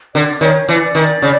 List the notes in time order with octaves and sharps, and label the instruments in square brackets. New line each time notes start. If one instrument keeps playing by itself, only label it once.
[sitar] D3 [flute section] D5
[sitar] D#3 [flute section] C#5
[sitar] E3 [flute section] D5
[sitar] D#3
C#3